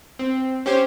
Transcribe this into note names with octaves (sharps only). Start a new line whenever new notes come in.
C4
C#4 G4 C5